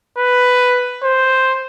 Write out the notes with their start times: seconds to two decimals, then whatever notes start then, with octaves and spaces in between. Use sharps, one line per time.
0.18 B4
1.04 C5